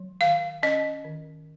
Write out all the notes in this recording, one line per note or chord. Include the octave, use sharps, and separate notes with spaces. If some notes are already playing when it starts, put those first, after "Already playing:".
Already playing: F#3
D#3 F5
C#4 D#5
D#3